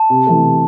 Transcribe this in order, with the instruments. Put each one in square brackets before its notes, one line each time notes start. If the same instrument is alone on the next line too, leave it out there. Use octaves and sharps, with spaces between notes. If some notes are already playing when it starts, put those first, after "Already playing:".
Already playing: [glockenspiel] A5
[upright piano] C3
E3 A3
C3